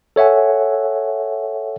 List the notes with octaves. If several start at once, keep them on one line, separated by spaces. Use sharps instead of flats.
A4 C#5 E5 F#5 G#5